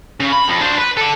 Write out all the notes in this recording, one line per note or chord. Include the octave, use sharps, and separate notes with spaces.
C#3
B5
F2
D4 C5
B4
A4 D5